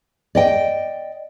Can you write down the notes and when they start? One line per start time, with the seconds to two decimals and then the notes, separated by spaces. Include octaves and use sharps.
0.35 D5 D#5 G5